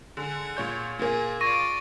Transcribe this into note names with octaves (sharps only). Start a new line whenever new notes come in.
D3 G#4 F#5
A#2 C#5 G6
A#2 A#3 G#4
F4 D5 C#6 A#6 D#7